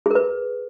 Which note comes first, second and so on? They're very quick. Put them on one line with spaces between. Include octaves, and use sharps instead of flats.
G#4 A#4 B4